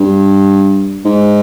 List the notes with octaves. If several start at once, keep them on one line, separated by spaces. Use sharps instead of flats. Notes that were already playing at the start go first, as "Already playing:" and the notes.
Already playing: G2
G#2